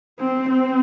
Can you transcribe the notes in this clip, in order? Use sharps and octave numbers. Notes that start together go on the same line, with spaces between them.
C4
C4